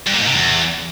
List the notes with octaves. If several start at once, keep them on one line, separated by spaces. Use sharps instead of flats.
G2
A#2
G#2
C3
E2